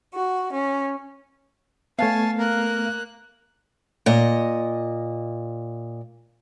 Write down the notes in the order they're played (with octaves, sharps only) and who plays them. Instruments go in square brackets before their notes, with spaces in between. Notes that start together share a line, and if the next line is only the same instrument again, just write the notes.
[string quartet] F#4
C#4
[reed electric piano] A3 B3 [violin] C#5 G#5 [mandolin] F5 [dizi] A5
[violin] A#3 F#6 [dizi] A#4
[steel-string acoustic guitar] A#2 D#5